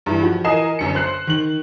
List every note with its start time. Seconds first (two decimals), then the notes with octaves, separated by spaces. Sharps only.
0.06 G2 E3
0.23 F3 F#4
0.44 E3 A#4 D#5 G#5 C7 E7
0.79 G1 F#2 C#7
0.95 C5 F#6 C7
1.27 D#3 F#7